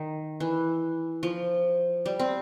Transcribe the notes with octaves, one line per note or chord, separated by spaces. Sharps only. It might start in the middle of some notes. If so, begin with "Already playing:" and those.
Already playing: D#3
E3
F3
G3
C4